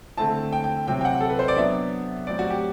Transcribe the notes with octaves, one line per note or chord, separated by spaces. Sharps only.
D3 A3 C4 E4 A5
G5
G5
C3 F#3 C4 E4 G5
G5
F#5
A4
B4
C5
D5
F#3 B3 D4 E5
A2 F#3 C4 D5
F#4
G4